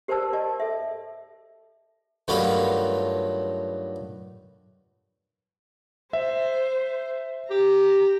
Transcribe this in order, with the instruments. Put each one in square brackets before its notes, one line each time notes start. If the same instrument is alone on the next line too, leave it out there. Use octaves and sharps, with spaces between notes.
[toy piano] G4 A#4 C5 D5 A5 E6
D5 D#5 A5
A4 E5
[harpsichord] G2 D#3 F#3 A3 B3 F4
[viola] C5 [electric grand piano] E5
[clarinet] G4 [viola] A#5